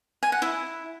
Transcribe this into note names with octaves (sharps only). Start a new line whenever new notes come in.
G#5
F#5
E4